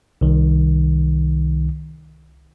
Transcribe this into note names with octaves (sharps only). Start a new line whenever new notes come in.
C2 D#3